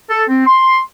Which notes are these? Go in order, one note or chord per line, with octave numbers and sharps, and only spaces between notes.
A4
C4
C6